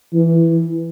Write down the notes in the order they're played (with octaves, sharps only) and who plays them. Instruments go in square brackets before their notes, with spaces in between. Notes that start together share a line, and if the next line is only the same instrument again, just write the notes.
[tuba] E3